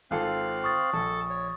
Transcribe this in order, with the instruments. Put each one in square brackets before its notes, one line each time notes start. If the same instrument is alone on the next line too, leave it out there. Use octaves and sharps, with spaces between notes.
[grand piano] G#1 F4 A4 [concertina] C4 F5 F#6
[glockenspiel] C#6 D#6 A6
[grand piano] A#1 [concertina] A4 A5
[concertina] C#5